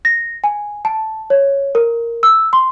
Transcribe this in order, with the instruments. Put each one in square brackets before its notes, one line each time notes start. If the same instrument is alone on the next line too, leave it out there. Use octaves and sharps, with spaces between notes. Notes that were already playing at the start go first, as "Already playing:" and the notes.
[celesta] A#6
G#5
A5
C#5
A#4
E6
C6